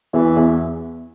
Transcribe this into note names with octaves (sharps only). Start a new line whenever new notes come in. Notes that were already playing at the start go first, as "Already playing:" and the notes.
E2 E3
E2